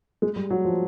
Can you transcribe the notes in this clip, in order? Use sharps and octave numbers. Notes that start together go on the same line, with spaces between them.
G#3
G3
F#3
F3